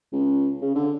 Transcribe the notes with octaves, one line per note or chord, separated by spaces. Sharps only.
C#2
C#3
D3